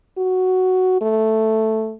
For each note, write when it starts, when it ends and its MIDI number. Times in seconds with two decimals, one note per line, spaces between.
0.18 0.98 66
1.01 1.94 57